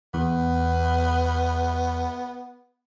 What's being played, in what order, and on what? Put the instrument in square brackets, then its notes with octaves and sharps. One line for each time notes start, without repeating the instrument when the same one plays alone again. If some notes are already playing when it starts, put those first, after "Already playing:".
[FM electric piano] E2 [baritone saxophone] B3